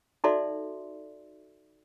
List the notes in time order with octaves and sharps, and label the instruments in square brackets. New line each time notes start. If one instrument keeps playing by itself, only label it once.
[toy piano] D#4 F#4 A4 D5 E5 C6